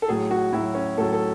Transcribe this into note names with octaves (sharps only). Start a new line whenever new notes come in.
A4
A2 F#3 G#4
F#4
A2 F#3 E4
C#4
A2 F#3 A4
A4